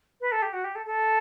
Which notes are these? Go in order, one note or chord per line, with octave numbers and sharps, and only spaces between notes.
B4
A4
G4
F#4
G4
A4
A4